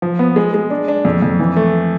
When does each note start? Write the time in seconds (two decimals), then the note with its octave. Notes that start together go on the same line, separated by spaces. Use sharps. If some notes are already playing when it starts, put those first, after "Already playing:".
0.02 F3
0.19 B3
0.36 G#3
0.54 G#3
0.70 D4
0.88 D4
1.05 F2
1.22 F2
1.39 E3
1.56 A3